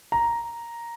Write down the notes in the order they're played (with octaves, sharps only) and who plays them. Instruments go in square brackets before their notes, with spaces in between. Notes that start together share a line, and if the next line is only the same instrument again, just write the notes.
[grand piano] A#5